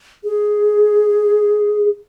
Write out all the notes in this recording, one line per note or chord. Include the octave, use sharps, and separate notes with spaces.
G#4